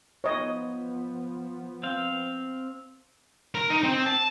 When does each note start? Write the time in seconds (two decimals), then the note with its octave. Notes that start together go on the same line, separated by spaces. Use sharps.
0.24 F3 B3 C#5 D#5
1.83 C4 F5
3.55 A#4
3.70 D#4
3.83 C4
4.06 A5